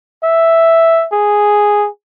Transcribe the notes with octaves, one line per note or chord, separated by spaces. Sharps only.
E5
G#4